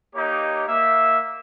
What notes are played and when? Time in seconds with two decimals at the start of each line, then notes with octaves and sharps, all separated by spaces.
0.14 A#3 D#4 G4 C#5
0.67 A#3 E5